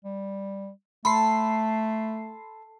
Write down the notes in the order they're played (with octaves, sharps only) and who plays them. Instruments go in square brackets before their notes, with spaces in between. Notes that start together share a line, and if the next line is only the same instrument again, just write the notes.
[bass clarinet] G3
[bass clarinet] A3 [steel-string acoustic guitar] A4 [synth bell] B5 C6 C7